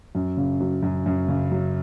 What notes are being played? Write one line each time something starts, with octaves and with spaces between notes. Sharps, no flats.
F#2
C#3
F#3
F#2
F#2
C#3
F#3